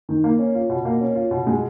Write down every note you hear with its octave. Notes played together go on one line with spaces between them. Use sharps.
D#3
A#3
C#4
F4
B2
A#3
C#4
F4
B2
G#3